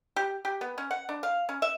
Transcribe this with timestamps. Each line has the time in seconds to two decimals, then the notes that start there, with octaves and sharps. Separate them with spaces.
0.16 G4
0.45 G4
0.61 B3
0.78 C#4
0.91 F#5
1.09 D4
1.23 F5
1.49 C#4
1.62 E5